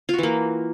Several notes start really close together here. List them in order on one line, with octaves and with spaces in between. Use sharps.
F4 F#4 E3 A#3